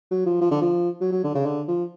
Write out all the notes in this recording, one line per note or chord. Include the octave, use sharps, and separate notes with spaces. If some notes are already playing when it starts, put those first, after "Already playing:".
F#3
F3
F3
D3
F3
F#3
F#3
D3
C#3
D3
F3